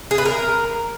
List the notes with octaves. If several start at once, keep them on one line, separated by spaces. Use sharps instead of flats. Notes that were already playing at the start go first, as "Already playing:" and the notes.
G#4
B4
A#4